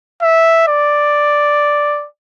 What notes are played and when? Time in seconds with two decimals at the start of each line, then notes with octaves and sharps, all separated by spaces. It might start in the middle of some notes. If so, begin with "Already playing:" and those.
0.22 E5
0.68 D5